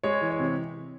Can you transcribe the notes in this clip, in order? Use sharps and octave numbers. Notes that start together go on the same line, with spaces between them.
G#3 C#5
E3
C#5
C3